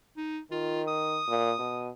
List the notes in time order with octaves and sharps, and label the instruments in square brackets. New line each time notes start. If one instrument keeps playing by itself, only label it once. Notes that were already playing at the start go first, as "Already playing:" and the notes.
[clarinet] D#4
[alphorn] D#3 [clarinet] F4
[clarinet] D#6
[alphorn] A#2
B2